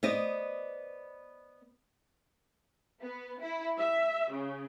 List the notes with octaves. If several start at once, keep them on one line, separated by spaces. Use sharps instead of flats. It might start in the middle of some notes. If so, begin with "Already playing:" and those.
B3 C5 D5 D#5
B3
E4
E5
C#3